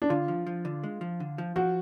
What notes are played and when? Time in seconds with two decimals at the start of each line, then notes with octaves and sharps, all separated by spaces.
0.02 D4
0.09 D3 F4
0.28 F3
0.47 F3
0.65 D3
0.83 G#3
1.01 F3
1.20 D3
1.38 F3
1.56 F3 F#4